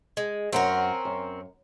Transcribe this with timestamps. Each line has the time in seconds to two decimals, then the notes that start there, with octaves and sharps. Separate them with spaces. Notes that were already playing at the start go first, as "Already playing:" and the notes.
0.17 G#3
0.53 F#2 C4 C#4 A#4 F#5 A#5
1.05 F#2